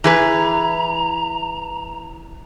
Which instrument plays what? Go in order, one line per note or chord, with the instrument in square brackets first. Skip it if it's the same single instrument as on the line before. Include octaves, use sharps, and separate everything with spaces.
[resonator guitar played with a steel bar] E3 G#4 B4 [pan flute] A#5